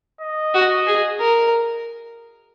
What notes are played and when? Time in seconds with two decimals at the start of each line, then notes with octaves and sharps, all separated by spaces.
0.21 D#5
0.54 F#4
0.87 G#4
1.19 A#4